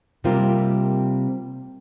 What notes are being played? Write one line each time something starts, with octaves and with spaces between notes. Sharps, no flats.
C3 G3 A#3 C4 F4 A#4